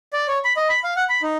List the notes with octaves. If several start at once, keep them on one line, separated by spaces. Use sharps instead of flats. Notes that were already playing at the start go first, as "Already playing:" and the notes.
D5
C#5
B5
D#5
B5
F5
F#5
B5
D#4